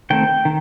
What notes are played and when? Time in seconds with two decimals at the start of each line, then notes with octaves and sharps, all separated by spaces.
0.10 D#3 A3 C4 G5
0.45 D#3